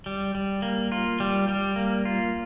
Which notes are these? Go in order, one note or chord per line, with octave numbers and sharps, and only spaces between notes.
G3
G3
A#3
F4
G3
G3
A#3
F4